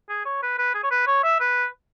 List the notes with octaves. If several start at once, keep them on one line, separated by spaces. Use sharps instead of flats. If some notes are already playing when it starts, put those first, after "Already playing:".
G#4
C#5
B4
B4
G#4
C#5
B4
C#5
E5
B4